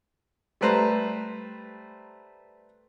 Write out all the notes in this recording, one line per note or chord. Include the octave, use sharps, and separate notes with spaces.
G3 A3 B4 C5 A#5